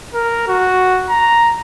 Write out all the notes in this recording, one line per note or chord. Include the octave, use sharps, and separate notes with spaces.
A#4
F#4
A#5